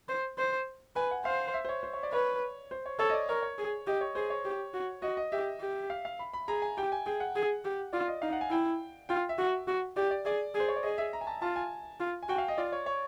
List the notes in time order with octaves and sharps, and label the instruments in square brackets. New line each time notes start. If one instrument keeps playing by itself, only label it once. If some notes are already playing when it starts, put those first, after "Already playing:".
[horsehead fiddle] C5
C5
[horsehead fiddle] B4 [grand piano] G#5
[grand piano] F#5
[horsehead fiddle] C5 [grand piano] F5
[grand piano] E5
C5
C#5
C5
C#5
D5
[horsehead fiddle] B4 [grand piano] C#5
[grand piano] C5
C#5
[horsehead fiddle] A4 [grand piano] C#5
[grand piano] D#5
D5
[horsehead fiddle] A#4 [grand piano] C#5
[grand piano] C#5
[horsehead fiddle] G#4
[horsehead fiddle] G4 [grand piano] D#5
[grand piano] C#5
[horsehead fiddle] G#4 [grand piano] C5
[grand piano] C#5
[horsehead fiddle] G4
F#4
[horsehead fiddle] F#4 [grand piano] D#5
[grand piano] D#5
[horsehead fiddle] G4 [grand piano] E5
[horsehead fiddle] G4
[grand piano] F5
F5
B5
B5
[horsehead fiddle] G#4 [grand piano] A#5
[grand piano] G#5
[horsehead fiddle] G4 [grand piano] G5
[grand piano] G#5
[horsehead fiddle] G#4 [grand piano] G5
[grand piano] F#5
[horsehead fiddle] G#4
G4
[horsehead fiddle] F4 [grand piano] D5
[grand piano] D#5
[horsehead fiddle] D#4 [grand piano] F5
[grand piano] F#5
G#5
[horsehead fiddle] E4 [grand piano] G5
[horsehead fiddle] F4 [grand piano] G5
[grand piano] E5
[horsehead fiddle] F#4
F#4
[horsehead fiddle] G4 [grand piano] D5
[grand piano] D5
[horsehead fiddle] G#4 [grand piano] D5
[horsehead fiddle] G#4
[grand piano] C5
C#5
D5
[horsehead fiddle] G#4 [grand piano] D#5
[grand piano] E5
A#5
G#5
A5
[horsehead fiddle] F4 [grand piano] A5
[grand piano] G#5
[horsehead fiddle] F4
[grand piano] G#5
[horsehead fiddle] F#4 [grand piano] G5
[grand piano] F5
D#5
[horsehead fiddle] F4 [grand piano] D5
[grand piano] C#5
C#5